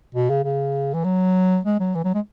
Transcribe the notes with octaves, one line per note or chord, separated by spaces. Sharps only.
B2
C#3
C#3
E3
F#3
G#3
F#3
E3
F#3
G#3